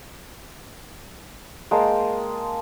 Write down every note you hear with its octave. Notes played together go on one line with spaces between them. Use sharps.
G#3 A#3 G5 A5